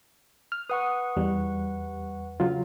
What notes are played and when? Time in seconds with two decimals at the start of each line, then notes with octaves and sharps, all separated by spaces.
0.52 F6
0.70 B4 F#5 C#6 D#6
1.17 E2 G3
2.40 C#3 F#3 F4